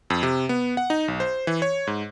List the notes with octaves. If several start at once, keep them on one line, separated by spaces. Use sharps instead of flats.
F2
C3
B3
F#5
D#4
B1
C5
E3
C#5
G#2